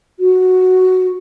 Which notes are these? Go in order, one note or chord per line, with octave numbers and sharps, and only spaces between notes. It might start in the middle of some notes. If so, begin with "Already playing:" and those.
F#4